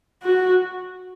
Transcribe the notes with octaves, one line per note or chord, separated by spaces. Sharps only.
F#4